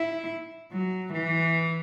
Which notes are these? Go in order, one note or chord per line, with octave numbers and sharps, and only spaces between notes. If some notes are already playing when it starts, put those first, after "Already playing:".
Already playing: E4
F#3
E3